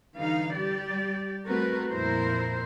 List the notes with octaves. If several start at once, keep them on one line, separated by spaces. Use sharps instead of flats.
D3 E3 G3 D#4 F5
G3 G4 D5
G3 A3 C4 F#4 A#4 B4
F2 A#2 E4 A#4 C5